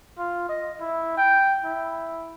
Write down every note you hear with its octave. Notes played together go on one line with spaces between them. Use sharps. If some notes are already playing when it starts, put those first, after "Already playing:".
F4
D#5
E4
G5
E4